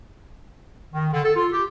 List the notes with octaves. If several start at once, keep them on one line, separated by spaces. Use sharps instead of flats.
D#3
D3
A4
F4
G4